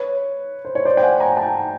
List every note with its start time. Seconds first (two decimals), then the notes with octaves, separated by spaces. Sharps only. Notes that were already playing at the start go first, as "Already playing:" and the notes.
Already playing: B4 C#5
0.65 C5
0.75 C#5
0.85 C5 D5
0.97 G5
1.03 F#5 G#5
1.20 G#5 A#5
1.37 G5 A5